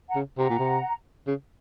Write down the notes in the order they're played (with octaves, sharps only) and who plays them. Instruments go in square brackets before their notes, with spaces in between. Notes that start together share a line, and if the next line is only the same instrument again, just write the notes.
[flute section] F#5 A#5
[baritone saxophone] C#3
[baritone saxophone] C3 [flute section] F#5 A#5
[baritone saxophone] A#2
C3
C#3